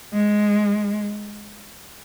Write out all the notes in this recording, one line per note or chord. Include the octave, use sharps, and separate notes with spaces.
G#3